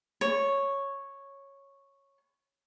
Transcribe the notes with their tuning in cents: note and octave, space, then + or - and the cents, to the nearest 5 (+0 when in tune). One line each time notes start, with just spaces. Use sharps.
C#5 -5